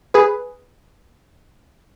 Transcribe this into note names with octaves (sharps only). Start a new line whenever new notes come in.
G#4 B4